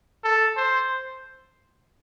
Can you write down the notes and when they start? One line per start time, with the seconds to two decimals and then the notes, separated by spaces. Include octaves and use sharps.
0.24 A4
0.57 C5